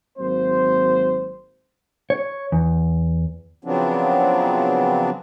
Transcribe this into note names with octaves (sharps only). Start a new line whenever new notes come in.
G#1 F#3 A#3 C4 C5
C#5
E2
C#3 F3 F#3 B3 C4 D4